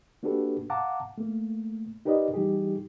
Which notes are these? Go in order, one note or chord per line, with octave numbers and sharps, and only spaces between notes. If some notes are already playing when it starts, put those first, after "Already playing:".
A#3 D4 F#4 G4 A4 B4
F5 F#5 A5 A#5 D6
A3 A#3
D#4 G4 A#4 B4 D5 D#5
E3 G3 D#4 G4 G#4